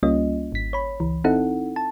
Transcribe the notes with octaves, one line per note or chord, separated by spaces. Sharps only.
C#2 G3 A#3 C#4 F4 D#5
G#1 B6
C#5 B5
C#2 E3
C4 D#4 E4 A4 F#5
A5